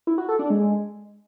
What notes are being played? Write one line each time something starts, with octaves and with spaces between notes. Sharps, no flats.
E4
F#4
A4
D4
G#3